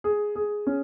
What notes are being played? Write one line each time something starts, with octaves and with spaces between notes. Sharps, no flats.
G#4
G#4
C#4